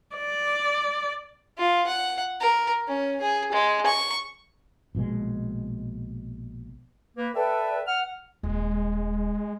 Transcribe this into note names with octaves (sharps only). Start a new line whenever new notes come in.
D5
F4
F#5
A#4
C#4
G#4
G#3
C#6
A#1 B2 G#3
A#3 B4
A4 B4 D5 E5 G5
F#5 F6
D#1 G#3